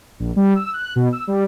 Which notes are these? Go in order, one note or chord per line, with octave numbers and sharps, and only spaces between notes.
A#1
G3
E6
F#6
B2
E6
G3